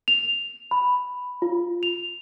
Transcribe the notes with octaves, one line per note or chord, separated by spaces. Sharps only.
F7
B5
F4
F7